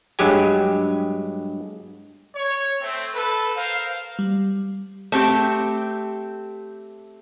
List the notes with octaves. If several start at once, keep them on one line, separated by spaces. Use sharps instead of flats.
G2 F#3 G#3 G4 G#5
C#5
A3 C4
A4 B4
A#4 C5 F5
G3
A3 C4 G4